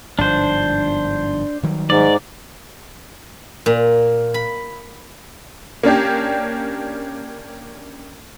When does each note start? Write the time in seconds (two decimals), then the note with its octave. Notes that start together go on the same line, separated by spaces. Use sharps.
0.19 G1 G#2 F3 D4 C5
1.63 D#3 F#3 G3
1.90 G#2 D5
3.66 A#2
4.34 B5
5.83 A#3 C#4 D4 G4